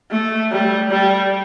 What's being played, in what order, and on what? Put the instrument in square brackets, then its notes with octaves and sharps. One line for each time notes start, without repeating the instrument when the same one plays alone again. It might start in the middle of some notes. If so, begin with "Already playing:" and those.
[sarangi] A3
G3
G3